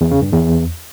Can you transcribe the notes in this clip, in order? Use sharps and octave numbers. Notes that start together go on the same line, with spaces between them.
E2
C#3
G2
E2